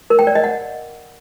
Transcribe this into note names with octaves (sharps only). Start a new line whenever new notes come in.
A#4
G5
D5
D#5
F#5